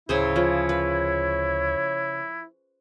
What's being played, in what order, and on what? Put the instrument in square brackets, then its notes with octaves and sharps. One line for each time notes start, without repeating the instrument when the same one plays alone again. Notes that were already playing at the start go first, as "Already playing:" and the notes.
[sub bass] D2 [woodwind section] A2 F#3 [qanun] C#3 G#4 C5 [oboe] E4
[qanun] F3 [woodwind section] C#5
[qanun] B4